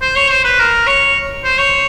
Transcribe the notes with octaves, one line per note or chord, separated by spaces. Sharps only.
C5
C#5
C5
B4
A#4
C#5
C5
C#5